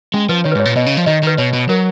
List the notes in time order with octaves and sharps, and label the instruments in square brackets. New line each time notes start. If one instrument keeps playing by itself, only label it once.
[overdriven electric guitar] G#3 [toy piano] C#4
[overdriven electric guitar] F3 [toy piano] B4
[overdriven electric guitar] D#3 [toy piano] C#5
[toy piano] B4
[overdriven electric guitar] G#2 [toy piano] C#5
[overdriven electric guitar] A#2
[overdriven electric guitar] B2 [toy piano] D#5
[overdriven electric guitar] C#3
F3
[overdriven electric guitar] D#3 [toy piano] D#5
[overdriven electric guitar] D#3 [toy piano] B4
[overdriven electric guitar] B2 [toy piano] C#5
[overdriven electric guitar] B2
[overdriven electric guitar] F#3 [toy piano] A#4